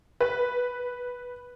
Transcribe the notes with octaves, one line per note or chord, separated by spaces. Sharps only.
B4